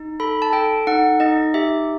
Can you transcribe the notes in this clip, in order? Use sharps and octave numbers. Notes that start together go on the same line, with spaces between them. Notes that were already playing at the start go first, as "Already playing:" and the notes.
Already playing: D#4
A4 B5
A5
A4 G5
D#4 F#5
D#4 D#5
G4 E5